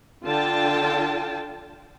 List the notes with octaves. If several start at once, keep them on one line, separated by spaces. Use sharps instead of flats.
D3 F4 G5 A5